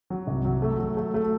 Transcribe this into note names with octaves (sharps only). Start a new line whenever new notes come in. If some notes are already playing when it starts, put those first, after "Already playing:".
F#3
C2
F#3
A3
F#3
A3
A3